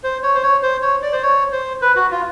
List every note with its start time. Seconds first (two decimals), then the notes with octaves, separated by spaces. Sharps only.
0.04 C5
0.23 C#5
0.35 C5
0.43 C#5
0.63 C5
0.82 C#5
1.02 D5
1.12 C5
1.23 C#5
1.52 C5
1.82 B4
1.96 F#4
2.11 F4